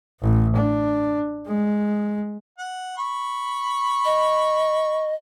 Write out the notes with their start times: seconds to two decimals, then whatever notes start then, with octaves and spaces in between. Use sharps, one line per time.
0.21 A1
0.56 D4
1.47 G#3
2.58 F#5
2.97 B5 C#6
4.05 D#5